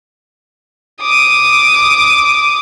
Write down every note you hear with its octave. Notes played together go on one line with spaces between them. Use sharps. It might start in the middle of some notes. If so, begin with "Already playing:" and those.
D6 D#6